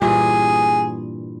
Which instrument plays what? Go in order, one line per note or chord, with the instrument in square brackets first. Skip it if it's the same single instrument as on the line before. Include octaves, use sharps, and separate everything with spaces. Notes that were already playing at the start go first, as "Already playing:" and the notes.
[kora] G2 A#2 E3 [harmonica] G#4